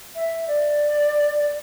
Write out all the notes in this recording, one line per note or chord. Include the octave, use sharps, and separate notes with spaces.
E5
D5